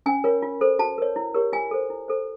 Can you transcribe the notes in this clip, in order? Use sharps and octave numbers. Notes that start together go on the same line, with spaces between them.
C#4 G#5
F4 A#4 C#5
F4
A4 C5
F#4 A5
A#4 C#5
E4
G4 A#4 C#5
F4 G#5
A4 C5
E4
A4 C5